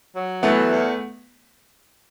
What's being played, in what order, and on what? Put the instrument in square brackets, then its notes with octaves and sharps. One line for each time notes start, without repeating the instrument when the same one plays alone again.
[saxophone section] F#3
[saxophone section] E3 [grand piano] A3 B3
[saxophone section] E2